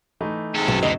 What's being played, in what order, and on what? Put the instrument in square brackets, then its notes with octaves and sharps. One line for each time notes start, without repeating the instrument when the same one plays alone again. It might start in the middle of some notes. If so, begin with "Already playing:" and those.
[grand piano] E3 A3 D#4
[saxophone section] G#2 C3 C4 [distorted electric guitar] C#4 A4
[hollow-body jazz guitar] B1 [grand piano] F#2
[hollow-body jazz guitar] D2 D#5 [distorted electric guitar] B2 D#3